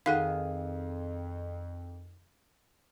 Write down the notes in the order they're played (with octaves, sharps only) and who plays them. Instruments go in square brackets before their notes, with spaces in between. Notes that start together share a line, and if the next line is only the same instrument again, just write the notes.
[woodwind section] F2 [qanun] D#3 G#4 [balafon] D#4 A4 F#5 [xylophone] F5